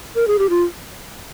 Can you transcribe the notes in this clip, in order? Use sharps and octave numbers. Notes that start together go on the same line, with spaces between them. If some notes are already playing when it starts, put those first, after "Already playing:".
A#4
G#4
G4
F4